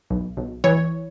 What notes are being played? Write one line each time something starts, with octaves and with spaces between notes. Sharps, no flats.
B1
B1
E3 C#5